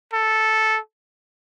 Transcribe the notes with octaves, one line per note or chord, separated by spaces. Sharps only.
A4